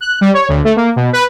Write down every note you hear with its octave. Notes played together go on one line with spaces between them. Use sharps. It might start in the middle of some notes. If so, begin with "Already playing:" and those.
F#6
G3
C#5
D2
A3
A#3
B2
B4